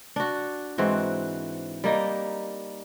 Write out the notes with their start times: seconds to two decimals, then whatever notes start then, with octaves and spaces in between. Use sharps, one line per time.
0.16 D4 F#4
0.78 G#2 E3 C4 F#4
1.84 G3 A#3 D#4